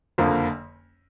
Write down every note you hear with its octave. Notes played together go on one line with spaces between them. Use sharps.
F#1 F2 D3 F3 A#3